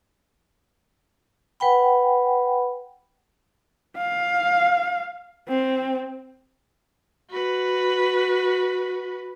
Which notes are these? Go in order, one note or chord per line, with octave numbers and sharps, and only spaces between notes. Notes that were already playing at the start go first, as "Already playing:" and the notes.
B4 F#5 G5 B5
F5
C4
F#4 B4